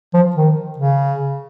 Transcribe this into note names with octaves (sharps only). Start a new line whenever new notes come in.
F3
D#3
C#3